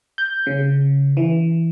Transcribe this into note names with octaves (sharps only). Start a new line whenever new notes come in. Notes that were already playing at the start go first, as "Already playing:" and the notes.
G6
C#3
E3